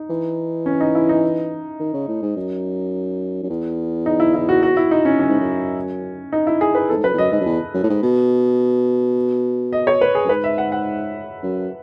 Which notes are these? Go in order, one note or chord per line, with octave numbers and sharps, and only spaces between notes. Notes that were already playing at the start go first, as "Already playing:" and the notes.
Already playing: D#4
E3
C#4
D#4
E4
D#4
D#3
C#3
A2
G#2
F#2
F#2
E2
D#4
E4
E4
F#4
F#4
E4
D#4
C#4
F#2 C#4
G#2
F#2
D#4
E4
G#4
B4
E2 A4
G#2
F#2 B4
E2
F#2 D#5
G#2 D#5
F#2
E2
F#2
A2
G#2
B2
D#5
C#5
B4
G#4
F#2
G#2 B4
E5
F#5
F#5
F#2